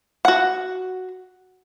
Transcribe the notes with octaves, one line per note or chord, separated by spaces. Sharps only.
F#4 F#5